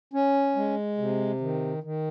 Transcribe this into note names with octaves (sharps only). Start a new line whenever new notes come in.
C#4
G#3
C3
D#3
D#3